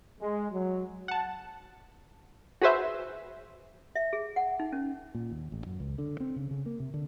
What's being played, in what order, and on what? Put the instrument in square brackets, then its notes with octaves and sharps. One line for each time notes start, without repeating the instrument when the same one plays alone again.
[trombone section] G#3
F#3
[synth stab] F#5 A5
F#4 G#4 B4 C5 E5
[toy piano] E5
G#4
F#5
D#4
C#4
[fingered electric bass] A#2
D#2
A1
F#2
C#2
D3
C4
C#3
C#3
A#3
C3
D3